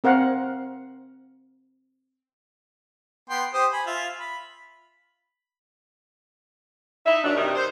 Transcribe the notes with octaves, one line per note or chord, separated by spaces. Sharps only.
C4 A#4 F5 F#5
B3 G5 C6
G4 C5 D#6
G#5 B5
F4 E5
B5
D#4 E5
F#2 F#3 D4
G2 C3 D#4 G4 A#4
C5